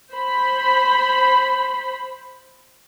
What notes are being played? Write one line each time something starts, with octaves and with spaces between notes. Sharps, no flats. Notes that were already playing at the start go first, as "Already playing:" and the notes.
C5 B5